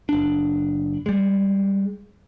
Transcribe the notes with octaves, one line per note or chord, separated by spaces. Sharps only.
F#1 D4
G3 G#3